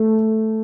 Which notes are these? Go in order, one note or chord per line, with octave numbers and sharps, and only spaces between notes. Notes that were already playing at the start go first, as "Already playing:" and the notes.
Already playing: A3